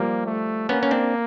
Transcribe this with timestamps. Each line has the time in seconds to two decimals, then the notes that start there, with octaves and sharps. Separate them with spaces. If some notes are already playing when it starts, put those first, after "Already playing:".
Already playing: F3 G3 A#3
0.26 A3
0.69 A#3 B3 C#4
0.83 C#4
0.91 C4 D4